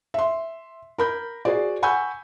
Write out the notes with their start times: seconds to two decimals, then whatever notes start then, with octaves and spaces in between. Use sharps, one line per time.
0.14 E5 C6
0.98 A#4 B5 G6
1.45 F#4 G#4 C5 D5
1.82 F#5 G#5 B5 C#6 E6 G6